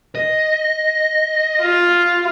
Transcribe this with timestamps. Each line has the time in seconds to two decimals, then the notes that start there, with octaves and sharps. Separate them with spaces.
0.15 D#5
1.61 F4